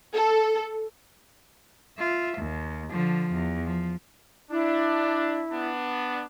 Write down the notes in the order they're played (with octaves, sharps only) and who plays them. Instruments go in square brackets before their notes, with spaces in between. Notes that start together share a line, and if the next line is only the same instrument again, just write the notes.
[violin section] A4
[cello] F4 E5
D#2
D3 F3
E2
F3
[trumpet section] D4 [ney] E4
[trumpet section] B3 D4